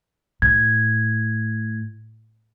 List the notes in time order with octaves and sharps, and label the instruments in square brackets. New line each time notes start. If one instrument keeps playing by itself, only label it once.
[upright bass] A2 [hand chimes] G#6